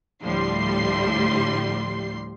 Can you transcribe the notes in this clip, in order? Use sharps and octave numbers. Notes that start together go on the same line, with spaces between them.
D2 A2 F3 G3 C6 C7